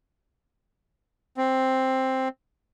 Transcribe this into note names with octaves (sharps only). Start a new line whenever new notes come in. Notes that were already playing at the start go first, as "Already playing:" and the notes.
C4